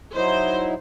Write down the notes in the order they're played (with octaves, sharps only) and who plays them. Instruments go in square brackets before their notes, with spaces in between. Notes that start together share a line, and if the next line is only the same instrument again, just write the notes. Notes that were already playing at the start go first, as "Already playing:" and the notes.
[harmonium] F#3 D#4 E4 [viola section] C5